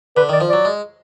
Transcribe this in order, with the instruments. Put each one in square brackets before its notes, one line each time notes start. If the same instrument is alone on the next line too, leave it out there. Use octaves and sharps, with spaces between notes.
[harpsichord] D3 [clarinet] B4
[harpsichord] D#3 [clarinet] D5
[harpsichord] F3
[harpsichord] F#3 [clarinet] D5
[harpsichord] G#3